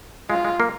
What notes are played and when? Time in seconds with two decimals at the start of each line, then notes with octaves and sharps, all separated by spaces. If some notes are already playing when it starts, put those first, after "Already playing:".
0.30 G#3 F4
0.45 G#3
0.60 A#3